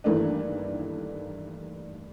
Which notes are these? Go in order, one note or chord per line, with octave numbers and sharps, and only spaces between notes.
G2 D#3 E3 A3 A#3 D4